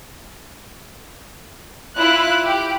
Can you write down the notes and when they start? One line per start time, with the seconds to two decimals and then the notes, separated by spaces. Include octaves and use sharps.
1.97 E4 F4 F5 F#6
2.44 G4